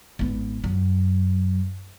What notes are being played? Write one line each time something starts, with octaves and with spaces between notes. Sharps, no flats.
G#1 B3
F#2